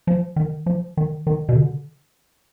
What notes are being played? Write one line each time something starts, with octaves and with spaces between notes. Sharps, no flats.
F3
D#3
F3
D#3
D#3
B2
D3